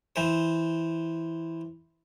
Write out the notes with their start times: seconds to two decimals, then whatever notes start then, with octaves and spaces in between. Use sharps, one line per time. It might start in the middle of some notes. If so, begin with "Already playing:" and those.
0.16 E3 C5